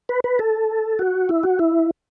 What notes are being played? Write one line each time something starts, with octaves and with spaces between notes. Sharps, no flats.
B4
B4
A4
F#4
E4
F#4
E4